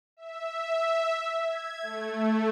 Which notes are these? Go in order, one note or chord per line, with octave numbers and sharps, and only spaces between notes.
E5
G#6
A3